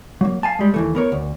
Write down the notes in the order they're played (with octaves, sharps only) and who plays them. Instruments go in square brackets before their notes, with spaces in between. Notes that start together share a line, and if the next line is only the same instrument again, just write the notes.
[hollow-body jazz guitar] F#3 A#3
F5 G#5 A5
G3 G#3
D#2 E3 A3
B3 A#4 C#5
D2